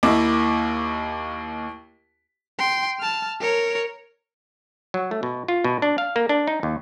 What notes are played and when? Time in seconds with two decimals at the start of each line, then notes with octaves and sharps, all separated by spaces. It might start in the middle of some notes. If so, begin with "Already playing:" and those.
0.03 D#2 A#3 E4 D#5 D6
2.59 G5 C6
3.00 A5 F6
3.40 A#4 C#5
4.94 F#3
5.11 A3
5.23 B2
5.48 F4
5.64 B2
5.82 D4
5.98 F5
6.16 A#3
6.29 D4
6.47 D#4
6.63 D#2